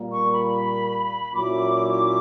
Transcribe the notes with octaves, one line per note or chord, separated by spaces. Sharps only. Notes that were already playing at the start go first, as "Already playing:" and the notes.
Already playing: A#2 G3 A#3
C#6
B5
A#2 F#3 C#4 E4 D6